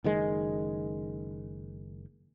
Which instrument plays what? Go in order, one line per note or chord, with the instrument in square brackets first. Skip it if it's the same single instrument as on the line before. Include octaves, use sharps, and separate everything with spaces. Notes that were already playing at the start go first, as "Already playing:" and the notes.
[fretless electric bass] F#1 D#3 G#3